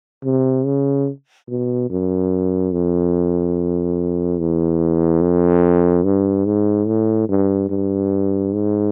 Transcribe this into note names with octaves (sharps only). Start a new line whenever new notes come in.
C3
C#3
B2
F#2
F2
E2
F2
G2
G#2
A2
G2
G2
G#2